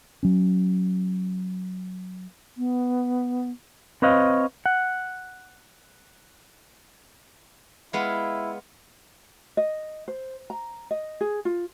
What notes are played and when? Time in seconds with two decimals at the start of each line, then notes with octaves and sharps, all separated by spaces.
0.23 F#3 C#4
2.57 B3
4.02 C4 B4 C#5 D#5 F5
4.66 F#5
7.93 G#3 B3 E4 F4
9.57 D#5
10.08 C5
10.50 A#5
10.91 D#5
11.21 G#4
11.45 F4